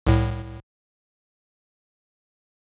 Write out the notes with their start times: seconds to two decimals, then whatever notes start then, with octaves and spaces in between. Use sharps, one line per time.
0.07 C2 A2